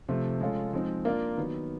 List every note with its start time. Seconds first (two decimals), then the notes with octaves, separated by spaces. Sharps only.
0.09 C3 F3 A3
0.41 G#3 C#4 F4 A4
0.73 F3 G#3 C4 D#4
1.05 A#3 D4 F4 A#4 D5
1.37 D#3 F#3 B3